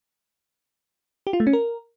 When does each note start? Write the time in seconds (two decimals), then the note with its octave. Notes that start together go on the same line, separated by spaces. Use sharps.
1.27 G4
1.33 F4
1.40 A3
1.47 C#4
1.53 A#4